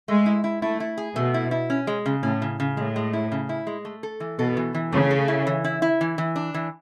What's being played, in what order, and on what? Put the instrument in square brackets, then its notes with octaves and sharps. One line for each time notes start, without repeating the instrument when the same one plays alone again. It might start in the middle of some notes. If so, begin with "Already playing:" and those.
[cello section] G#3 [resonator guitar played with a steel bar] A3
[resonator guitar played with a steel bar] E4
E4
[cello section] A3 [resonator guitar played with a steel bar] E4
[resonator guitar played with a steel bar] E4
G#4
[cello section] B2 [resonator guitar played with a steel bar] A3
[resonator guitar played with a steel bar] E4
E4
C#4
G#3
C#3
[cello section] A2 [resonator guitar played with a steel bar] C#4
[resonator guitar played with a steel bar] C#3
C#3
[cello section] A2 [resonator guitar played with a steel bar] G#3
[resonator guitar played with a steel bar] G#3
E4
C#3
E4
G#3
A3
A4
E3
[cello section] B2 [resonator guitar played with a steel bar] A4
[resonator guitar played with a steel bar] E3
E3
[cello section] C#3 [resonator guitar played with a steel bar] A3
[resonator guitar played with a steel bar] A4
E4
E3
E4
E4
E3
E3
D4
E3